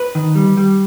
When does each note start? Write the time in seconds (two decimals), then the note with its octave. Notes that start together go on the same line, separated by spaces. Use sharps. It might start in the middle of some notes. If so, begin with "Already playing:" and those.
Already playing: B4
0.15 D#3
0.35 G3
0.57 G3